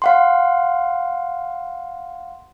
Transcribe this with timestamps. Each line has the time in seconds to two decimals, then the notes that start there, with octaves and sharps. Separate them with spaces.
0.02 F5 F#5 C6